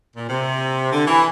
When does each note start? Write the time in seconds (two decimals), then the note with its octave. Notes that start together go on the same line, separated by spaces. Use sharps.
0.16 A#2
0.29 C3
0.92 D3
1.07 E3